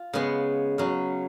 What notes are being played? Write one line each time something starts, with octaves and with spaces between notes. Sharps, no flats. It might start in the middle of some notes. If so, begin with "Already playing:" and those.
Already playing: F4
C#3 G#3 B3
C#3 F#3 C#4